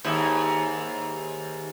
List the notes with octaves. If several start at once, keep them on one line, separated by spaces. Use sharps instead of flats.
D#2 G#2 E4